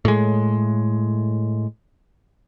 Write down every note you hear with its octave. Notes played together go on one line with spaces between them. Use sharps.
A2 G#3